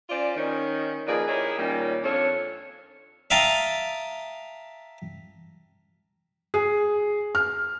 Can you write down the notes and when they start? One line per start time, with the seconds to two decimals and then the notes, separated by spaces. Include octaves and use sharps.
0.08 C#4 F4 C5 D5
0.36 D#3 C#4 D#4
1.07 F3 A#3 D#4 G#4 B4 D5
1.27 E4 G4 G#4 A#4 C#5 D#5
1.58 A#2 D#3 G3 C#4
2.03 F2 D4 F4 A4 C#5
3.30 E5 F5 G5 A5 A#5 D#6
6.54 G#4
7.35 F6